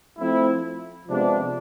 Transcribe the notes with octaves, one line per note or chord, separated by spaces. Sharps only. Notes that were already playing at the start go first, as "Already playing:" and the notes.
F3 A3 C4 E4
C3 F3 G#3 B3 D4